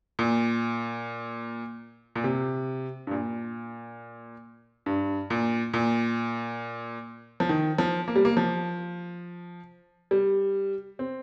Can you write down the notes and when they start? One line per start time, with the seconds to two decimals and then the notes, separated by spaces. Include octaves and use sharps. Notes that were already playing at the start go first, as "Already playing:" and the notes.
0.19 A#2
2.16 A#2
2.24 C3
3.07 G2
3.11 A#2
4.86 G2
5.30 A#2
5.74 A#2
7.40 F3
7.49 D#3
7.78 F3
8.08 A#3
8.16 G3
8.25 A#3
8.37 F3
10.11 G3
10.99 C4